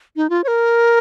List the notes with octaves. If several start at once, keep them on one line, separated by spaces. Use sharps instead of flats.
D#4
F4
C#5
A#4